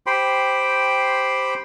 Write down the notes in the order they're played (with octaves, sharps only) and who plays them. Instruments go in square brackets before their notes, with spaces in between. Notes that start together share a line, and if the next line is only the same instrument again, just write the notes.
[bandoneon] G4 C5 G5 B5 C6